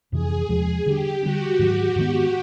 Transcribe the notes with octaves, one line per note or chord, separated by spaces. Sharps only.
F2 C3 E3 G#4
E2 C3 F3 G#3
D3 G3 B3 D4 G4
D3 G3 B3 D4 F#4
G#2 D#3 F#3
G#2 D#3 G#3 B3